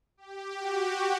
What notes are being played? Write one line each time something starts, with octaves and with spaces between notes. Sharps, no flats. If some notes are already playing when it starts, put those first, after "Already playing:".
G4
F#4